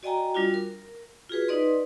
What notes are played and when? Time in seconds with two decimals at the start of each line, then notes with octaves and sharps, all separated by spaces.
0.03 F#4 D5 D#5 G5 G#5 A#5
0.35 G3 D4 F4 F#4
0.54 A#4
1.29 F4 F#4 G#4 B4
1.48 D#4 B4 D5 D#5 C6